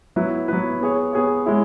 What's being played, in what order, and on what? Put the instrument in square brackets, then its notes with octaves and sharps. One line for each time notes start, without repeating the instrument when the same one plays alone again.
[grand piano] F#3 B3 E4 B4
F#3 B3 E4 B4
B3 G#4 C#5
B3 G#4 C#5
G#3 E4 C#5